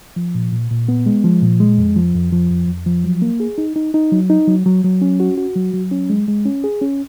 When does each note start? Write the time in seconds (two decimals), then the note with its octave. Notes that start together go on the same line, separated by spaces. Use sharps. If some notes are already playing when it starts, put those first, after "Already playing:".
0.16 F3
0.35 A#2
0.52 A#2
0.70 A#2
0.89 B3
1.06 G#3
1.24 F3
1.42 A#2
1.60 G#3
1.78 F2
1.96 F3
2.14 F2
2.32 F3
2.50 F2
2.68 F2
2.86 F3
3.04 F#3
3.22 A#3
3.40 G#4
3.58 D#4
3.76 D#4
3.94 D#4
4.12 F#3
4.30 D#4
4.48 F#3
4.66 F#3
4.84 F#3
5.02 C#4
5.20 F#4
5.38 F#4
5.56 F#3
5.74 F#3
5.92 C#4
6.10 G#3
6.28 G#3
6.46 C#4
6.64 G#4
6.81 C#4